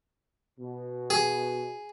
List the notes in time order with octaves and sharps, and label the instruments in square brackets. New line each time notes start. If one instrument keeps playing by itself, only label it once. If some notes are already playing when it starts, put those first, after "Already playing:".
[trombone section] B2
[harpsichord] G#4